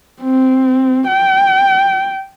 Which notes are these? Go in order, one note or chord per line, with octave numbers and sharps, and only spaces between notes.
C4
G5